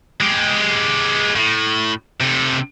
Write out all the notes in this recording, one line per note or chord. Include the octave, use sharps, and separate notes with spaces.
G#3 G4
A2
C3 A4